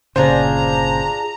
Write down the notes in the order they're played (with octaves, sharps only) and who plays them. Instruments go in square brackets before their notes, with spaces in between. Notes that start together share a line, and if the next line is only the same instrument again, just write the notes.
[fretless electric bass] G1 A#2 C#3 [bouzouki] D4 F4 G#4 [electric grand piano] C5 [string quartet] A#5